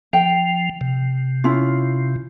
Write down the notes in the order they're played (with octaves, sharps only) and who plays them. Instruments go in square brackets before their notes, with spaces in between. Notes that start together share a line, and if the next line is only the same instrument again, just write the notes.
[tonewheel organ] F3 [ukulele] G5
[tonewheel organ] C3
[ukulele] C#4 E4 F4